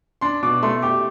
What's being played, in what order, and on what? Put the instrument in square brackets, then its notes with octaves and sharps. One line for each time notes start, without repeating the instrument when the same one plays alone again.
[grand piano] D4 [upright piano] C6
[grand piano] B2 [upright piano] D6
[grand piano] A3 [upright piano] C6
[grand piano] G4 [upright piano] D6